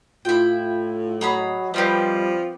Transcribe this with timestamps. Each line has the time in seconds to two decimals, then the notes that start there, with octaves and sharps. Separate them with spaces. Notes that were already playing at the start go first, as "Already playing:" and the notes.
0.25 A2 E4 F4 G5
1.21 F#3 G#4 D#5 A#5 B5
1.74 F3 G3 B3 C4 G4